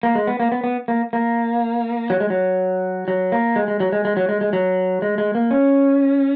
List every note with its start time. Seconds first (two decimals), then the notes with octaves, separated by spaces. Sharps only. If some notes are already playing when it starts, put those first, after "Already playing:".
0.03 A#3
0.15 G#3
0.27 B3
0.40 A#3
0.52 B3
0.64 B3
0.88 A#3
1.13 A#3
2.10 F#3
2.20 G#3
2.30 F#3
3.08 F#3
3.32 A#3
3.56 G#3
3.68 G#3
3.80 F#3
3.92 G#3
4.05 G#3
4.17 F#3
4.29 G#3
4.41 G#3
4.53 F#3
5.02 G#3
5.18 G#3
5.35 A#3
5.51 C#4